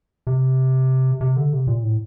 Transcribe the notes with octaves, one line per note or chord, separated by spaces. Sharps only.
C3
C3
D3
C3
A#2
A2